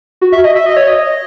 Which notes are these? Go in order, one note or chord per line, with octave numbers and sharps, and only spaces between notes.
F#4
E5
D#5
E5
D#5
C#5
D#5